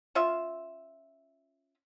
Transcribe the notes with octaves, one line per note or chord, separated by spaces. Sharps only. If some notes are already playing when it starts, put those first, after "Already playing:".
C#4 F4 E5